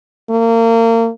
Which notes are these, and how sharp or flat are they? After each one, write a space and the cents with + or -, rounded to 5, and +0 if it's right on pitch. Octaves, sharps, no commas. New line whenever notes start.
A#3 -30